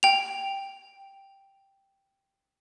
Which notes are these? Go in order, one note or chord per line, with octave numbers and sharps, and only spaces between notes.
G5 F7